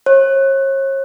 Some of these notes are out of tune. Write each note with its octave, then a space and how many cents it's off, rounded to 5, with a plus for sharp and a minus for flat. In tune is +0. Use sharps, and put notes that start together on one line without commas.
C#5 -40